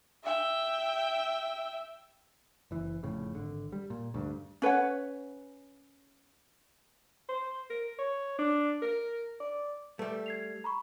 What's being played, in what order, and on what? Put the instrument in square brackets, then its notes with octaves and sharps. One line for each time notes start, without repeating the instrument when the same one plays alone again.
[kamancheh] E5 G5
[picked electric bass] F#1 E3
F1 F2 A2 C#3
G#1 D3
G3
A#2
D2 G2
[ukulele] C#4 B4 C#5 F#5
[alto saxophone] C5
A#4
C#5
D4
A#4
D5
[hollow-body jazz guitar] G3 A3 [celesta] B4
[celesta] G#6 C7 F7
A#5 B5 C#6